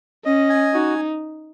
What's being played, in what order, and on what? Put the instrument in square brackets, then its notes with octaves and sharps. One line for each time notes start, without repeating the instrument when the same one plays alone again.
[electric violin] C#4 [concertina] D#5
[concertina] G#5
[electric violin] D#4 [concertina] F#4